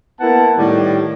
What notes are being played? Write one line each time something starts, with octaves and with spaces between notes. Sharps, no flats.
A#3 B3 E4 F#5 A5
A2 D#3 G3 G4